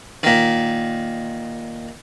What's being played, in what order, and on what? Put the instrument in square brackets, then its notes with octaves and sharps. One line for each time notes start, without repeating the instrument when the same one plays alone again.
[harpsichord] A#2 D#3